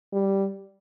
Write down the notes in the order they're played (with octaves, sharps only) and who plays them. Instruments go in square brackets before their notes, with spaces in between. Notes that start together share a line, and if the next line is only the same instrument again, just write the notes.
[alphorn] G3